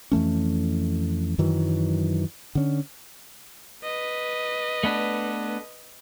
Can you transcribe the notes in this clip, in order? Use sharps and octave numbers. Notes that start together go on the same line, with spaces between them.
F2 E3 A3 C#4
F#2 D#3 E3 F#3
D3 C#4
B4 D#5
A3 B3 D4